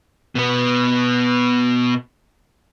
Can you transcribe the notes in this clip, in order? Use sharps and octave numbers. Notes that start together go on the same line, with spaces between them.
B2 B3